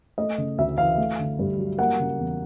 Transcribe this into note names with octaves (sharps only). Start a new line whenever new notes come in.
A3 D#5
C#3
D2 E5
E3 F5
A3
D3
G2
F#3
A#3 F#5
C#3
E2